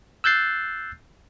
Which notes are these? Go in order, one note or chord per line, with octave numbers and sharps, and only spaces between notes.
E6 F#6 G6 A6 C7